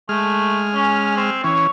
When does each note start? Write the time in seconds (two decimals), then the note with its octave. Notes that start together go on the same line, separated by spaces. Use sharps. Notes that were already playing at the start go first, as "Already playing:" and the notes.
0.09 G#3 A3 F6
0.74 C#4
1.17 C4
1.44 E3 C#4 C#5